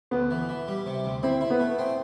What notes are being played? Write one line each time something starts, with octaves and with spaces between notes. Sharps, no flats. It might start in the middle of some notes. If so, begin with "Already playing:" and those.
D2 B3
E3
E3
G3
C3
D2
C4 E4
E4
B3
A3
C4